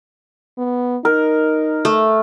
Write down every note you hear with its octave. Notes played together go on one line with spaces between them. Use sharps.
B3
D#4 A#4
A3